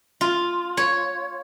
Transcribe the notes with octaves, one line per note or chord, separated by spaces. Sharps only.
F4
C#5